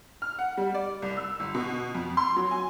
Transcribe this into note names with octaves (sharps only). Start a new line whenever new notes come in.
F6
F#5
G3
D5
C2
E6
G1
B2
F2
C6
F#3
G#5